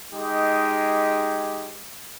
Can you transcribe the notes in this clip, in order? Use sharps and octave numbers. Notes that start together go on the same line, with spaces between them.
G#3 D#4 G4